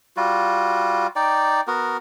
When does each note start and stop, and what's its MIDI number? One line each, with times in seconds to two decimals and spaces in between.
0.17 1.07 55
0.17 1.07 65
0.17 1.07 66
1.16 1.61 63
1.16 1.61 74
1.16 1.61 79
1.67 1.97 59
1.67 1.97 66
1.67 1.97 70